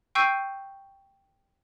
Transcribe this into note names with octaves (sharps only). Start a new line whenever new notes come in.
G5 C#6 E6 G6 C7 D#7